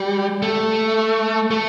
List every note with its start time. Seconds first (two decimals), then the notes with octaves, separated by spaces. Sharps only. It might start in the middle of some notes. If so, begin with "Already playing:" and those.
Already playing: G3
0.42 A3
1.51 A3